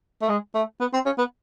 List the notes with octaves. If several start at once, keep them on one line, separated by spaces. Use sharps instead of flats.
A3
G#3
A3
B3
C4
C#4
B3